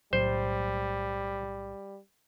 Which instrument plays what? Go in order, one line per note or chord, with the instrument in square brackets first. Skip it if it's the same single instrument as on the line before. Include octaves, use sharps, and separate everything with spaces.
[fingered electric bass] B1 A2 F#3 [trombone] G3 [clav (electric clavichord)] C5